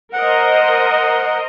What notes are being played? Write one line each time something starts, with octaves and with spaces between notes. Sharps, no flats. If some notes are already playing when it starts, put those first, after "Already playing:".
A#4 C5 D#5 F#5